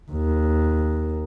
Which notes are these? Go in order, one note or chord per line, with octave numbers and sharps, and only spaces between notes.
D#2